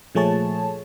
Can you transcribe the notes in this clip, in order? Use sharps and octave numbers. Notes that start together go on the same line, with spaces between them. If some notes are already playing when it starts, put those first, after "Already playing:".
A#2 F3 A3 G#4 C#5 A5